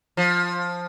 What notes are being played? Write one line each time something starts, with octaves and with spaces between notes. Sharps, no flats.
F3